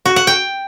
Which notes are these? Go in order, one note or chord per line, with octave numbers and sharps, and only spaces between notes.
F#4
F#5
G5